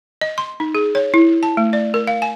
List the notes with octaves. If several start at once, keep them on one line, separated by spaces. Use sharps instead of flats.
D#5
C6
D#4
G#4
C#5
E4
A5
A3
D5
A#4
F5
G#5